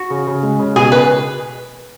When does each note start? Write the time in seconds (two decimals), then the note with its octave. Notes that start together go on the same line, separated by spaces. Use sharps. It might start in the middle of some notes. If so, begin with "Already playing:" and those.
Already playing: F#4
0.10 C#3
0.27 C#3
0.43 G#3
0.59 C#3
0.76 B2 G#4
0.92 B4